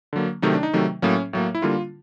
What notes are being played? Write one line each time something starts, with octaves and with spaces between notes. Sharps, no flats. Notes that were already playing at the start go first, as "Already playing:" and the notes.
D3 F#3 A#3
C3 D#3 F#3 A3 D#4
D4
D#4
C3 D#3 F#3 A3
A2 F#3 A#3 C#4
A2 F#3 A#3
E4
D3 G3 A#3 F4